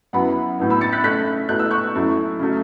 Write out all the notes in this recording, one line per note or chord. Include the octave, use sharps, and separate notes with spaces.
F#2 F#3 B3 E4 F#5 B5
A2 F#3 B3 E4
B5 E6
A6 C#7
F#6 B6
C#3 A3 C#4 F#6 B6
B2 A3 C#4 E4 F#6
E6
C#6 F#6
F#2 F#3 A3 E4
C#3 F#3 A3